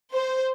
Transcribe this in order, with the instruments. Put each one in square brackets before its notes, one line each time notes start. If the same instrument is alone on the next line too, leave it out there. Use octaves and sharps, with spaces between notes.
[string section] C5